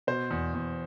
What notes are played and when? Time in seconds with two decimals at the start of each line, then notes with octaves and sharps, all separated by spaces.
0.07 B2 C5
0.30 E2
0.54 E2